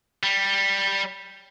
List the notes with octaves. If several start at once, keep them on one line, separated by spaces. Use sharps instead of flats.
G3